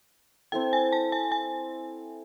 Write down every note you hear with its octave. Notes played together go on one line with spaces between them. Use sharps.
C4 E4 A4 G5
G#5
A5
G#5
G#5